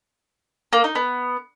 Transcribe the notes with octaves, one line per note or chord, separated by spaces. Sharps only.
A#3
D#4
B3